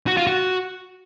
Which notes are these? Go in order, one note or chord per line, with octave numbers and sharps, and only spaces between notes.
F#4
F4
F#4